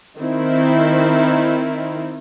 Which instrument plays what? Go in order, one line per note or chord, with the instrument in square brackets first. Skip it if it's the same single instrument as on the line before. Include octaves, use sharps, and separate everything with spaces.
[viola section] D#3 C4 E4